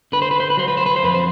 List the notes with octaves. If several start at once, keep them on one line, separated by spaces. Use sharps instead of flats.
D3 B4
C5
B4
C5
B4
F#3 C5
B4
C5
B4
C5
F2 B4
C5